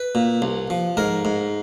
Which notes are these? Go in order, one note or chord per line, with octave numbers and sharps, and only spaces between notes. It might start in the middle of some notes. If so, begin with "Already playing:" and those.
Already playing: B4
A#2
C2
F3
G#2 A#4
G#2